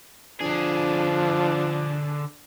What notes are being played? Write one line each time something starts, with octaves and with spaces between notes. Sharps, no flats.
D3 F3 D4 G#4